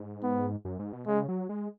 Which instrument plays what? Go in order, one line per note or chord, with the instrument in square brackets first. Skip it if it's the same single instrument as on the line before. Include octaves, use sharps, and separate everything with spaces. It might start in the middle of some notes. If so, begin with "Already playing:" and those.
Already playing: [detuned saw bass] G#2
[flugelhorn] B3
[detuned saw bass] F#2
G#2
B2
[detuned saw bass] C#3 [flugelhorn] G#3
[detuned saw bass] F#3
G#3